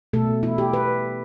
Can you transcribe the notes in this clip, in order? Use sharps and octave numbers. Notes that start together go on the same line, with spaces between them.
B2 A3 A4
E4
G4
B4